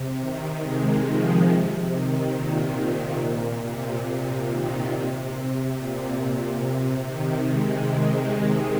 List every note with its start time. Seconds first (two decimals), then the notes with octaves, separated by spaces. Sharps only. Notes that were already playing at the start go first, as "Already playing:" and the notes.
Already playing: C3
0.20 D#3
0.63 G#3
1.06 F3
1.49 C3
1.92 D#3
2.34 A#2
2.77 C3
3.20 A#2
3.63 C3
4.49 D#3
4.91 C3
5.77 A#2
6.19 C3
6.63 C3
7.06 D#3
7.48 G#3
7.91 G#3